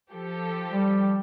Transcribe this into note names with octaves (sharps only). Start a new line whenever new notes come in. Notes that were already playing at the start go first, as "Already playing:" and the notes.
F3 G4 A4
G3